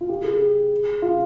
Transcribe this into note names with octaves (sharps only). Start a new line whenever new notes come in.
F4
G4
G#4
F4